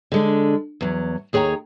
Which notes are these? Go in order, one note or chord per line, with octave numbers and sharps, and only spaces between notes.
D3 G#3 D4
E2 F#3
D#2 G#4 C#5 G5 A#5